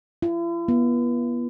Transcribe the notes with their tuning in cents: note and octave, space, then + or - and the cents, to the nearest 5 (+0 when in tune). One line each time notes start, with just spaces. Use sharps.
E4 +45
B3 -35